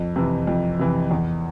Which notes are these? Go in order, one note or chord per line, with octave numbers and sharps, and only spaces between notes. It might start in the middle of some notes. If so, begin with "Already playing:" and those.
Already playing: F2
C3 E3
F2
C3 E3
E2